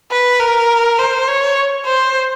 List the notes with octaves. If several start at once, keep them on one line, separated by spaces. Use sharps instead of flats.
B4
A#4
C5
C#5
C5